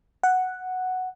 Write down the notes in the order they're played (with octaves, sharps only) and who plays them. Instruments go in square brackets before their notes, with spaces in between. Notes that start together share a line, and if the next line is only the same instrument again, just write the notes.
[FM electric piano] F#5